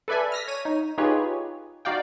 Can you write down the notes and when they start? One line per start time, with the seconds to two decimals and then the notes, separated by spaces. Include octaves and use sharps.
0.08 A4 B4 D5 E5 G#5
0.32 F6 A#6 B6
0.48 C#5 D#7
0.65 D#4
0.98 D#4 F4 G4 G#4 B4 C#5
1.85 D#4 F#4 D5 F5 G5